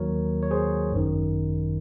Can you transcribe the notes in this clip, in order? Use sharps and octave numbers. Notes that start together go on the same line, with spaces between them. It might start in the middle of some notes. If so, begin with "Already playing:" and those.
Already playing: D#2 D#3 F#3 A#3 A#4 C#5
C#5
G#4 C5
G#1 F#2 D#3